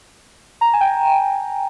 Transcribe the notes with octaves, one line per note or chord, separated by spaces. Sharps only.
A#5
G#5
G5